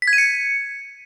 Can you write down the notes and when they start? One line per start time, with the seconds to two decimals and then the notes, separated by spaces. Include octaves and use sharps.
0.02 B6
0.08 G#6
0.13 D#7
0.18 C#7